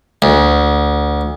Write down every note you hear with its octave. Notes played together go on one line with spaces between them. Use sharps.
D2